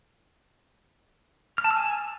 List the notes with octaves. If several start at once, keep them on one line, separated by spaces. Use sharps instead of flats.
F6
A5
E6
G#5